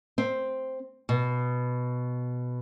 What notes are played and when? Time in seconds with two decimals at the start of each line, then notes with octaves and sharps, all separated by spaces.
0.18 C4
1.09 B2